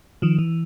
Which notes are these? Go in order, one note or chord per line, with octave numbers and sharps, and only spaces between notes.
D#3 F3
E3